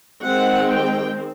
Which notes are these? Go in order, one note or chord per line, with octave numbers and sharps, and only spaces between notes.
D#3 G#3 C4 F#5
G5